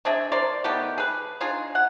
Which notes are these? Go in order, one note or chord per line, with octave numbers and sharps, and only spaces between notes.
C4 D4 G#4 E5
A#4 C5 D5
D#3 A3 B3 G4
G#4 B4
D4 D#4 F4 G#4
F#5